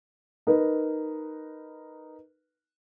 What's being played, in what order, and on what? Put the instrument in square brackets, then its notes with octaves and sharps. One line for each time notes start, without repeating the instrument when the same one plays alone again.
[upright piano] D#4 A#4 B4